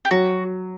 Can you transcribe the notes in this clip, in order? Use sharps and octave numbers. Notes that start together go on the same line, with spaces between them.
G4
F#3 F#4